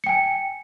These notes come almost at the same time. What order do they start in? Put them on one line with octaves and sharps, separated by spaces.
C#7 G5 G#5